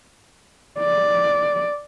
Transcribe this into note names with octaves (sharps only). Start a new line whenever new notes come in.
D5